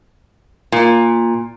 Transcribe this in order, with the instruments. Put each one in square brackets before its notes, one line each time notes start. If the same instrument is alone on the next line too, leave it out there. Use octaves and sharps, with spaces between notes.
[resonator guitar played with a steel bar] A#2